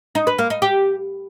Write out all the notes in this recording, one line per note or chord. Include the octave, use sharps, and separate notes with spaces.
D#4
B4
A#3
D#4
G4